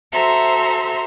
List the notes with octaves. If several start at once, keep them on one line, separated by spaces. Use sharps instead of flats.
F#4 A4 C5 E5 A#5 C6